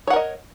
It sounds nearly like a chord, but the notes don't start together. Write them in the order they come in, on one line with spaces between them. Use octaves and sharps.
C#5 F#5 A#4 D#5